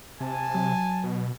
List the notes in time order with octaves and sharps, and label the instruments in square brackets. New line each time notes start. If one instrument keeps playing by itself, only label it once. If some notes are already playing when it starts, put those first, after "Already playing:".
[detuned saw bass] C3 [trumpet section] G#5 A5
[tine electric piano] F#3
[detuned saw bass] B2